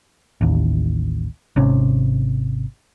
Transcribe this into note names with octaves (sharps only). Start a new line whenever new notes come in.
A1 D#2
G#1 C3 C#4